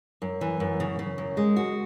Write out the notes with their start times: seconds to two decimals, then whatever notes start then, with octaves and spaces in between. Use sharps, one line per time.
0.22 F#2
0.41 E3
0.60 F#2
0.80 C#3
0.99 C#3
1.18 F#2
1.37 G#3
1.56 F#4